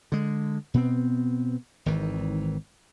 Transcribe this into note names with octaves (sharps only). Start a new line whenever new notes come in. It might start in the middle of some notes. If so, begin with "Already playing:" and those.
D3 G#3
B2 B3 C4
G#1 D#3 E3